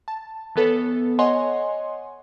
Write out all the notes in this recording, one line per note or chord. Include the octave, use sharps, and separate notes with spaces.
A5
E3 B3 A4 B4 C#5
C#5 D#5 F#5 G#5 C6